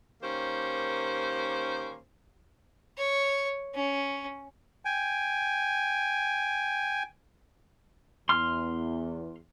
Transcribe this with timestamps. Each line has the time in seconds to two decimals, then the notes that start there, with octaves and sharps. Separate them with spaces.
0.22 D#3 A#3 C#4 G4 C5
2.98 C#5
3.75 C#4
4.85 G5 G#5
8.29 E2 C6 F6